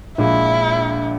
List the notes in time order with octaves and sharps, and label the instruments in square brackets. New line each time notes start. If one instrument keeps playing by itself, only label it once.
[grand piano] A#1 A#2 G#3 [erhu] E4